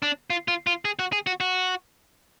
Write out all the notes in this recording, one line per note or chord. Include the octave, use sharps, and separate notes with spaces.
D4
F4
F4
F4
G#4
F#4
G#4
F#4
F#4